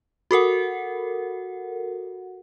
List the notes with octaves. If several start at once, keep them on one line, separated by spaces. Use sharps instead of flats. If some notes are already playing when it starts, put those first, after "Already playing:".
F#4 A4 A#4 F#5